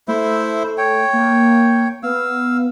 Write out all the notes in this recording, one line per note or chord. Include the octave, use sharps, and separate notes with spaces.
A3 E4 C5 E5
C#5 G5
A#3
B3 F5 E6